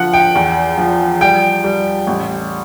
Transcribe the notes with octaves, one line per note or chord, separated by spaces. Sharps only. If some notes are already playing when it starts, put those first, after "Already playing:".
Already playing: D3 F3 F#5
G5
E2
F3
G3 G5
G3
A1